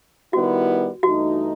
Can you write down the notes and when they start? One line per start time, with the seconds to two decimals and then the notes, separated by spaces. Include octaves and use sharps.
0.33 D#3 G3 B3 E4 F#4
1.03 G2 E3 A3 D#4 F#4